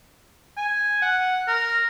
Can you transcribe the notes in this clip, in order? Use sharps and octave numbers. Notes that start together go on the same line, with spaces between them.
G#5
F#5
A#4